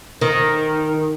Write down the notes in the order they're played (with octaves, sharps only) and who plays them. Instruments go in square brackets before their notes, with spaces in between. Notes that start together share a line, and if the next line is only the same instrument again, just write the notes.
[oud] D#3